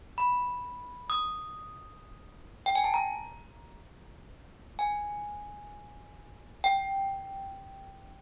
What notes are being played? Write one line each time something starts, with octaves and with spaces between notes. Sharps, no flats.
B5
D#6
G5
G#5
A5
A#5
G#5
G5